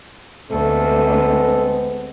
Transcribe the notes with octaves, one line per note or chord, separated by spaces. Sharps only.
D2 G#3 B3 C4 A4